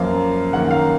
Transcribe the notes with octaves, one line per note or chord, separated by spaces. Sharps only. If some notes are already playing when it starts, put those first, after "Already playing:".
Already playing: F#2 F3 A#3 F5
F#2 D#3 A#3 F#5
F5